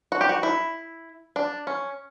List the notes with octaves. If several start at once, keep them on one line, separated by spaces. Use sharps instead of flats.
F#4
G4
F#4
E4
D4
C#4